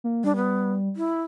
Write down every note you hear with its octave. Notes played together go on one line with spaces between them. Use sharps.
A#3
G3 D4
B3
E4